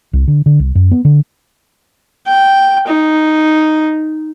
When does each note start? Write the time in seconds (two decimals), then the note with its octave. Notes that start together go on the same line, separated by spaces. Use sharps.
0.13 C2
0.28 D3
0.46 D3
0.59 C2
0.75 F#2
0.91 B3
1.05 D3
2.27 G5
2.87 D#4